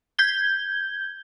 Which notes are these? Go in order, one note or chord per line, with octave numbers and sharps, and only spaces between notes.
G6 G#6 G7